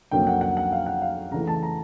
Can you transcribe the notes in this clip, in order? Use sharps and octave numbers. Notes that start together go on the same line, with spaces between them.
F2 D3 F#3 A#3 C#4 G5
F#5
F#5
F#5
F5
F#5
F5
C#3 E3 A3 A#5
A5
A#5